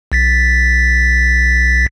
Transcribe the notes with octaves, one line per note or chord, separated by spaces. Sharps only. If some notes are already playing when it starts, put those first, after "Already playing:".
B1 A6 B6